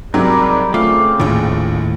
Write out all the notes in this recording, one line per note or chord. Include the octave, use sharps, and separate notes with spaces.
G#2 C3 F#3 G3 A#4 D5
C#3 A3 C4 F4 D6
A#1 D#2 A2